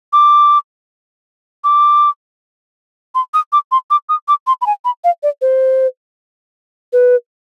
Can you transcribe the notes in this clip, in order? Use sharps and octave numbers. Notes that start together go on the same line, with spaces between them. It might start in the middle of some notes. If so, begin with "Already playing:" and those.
D6
D6
C6
D#6
D6
C6
D6
D#6
D6
C6
B5
G#5
B5
F5
D5
C5
B4